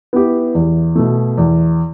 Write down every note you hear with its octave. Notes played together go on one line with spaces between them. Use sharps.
B3 E4 G4
E2
B2 A3
E2